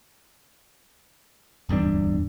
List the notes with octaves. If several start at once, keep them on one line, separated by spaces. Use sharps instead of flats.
D1 E2 G2 D4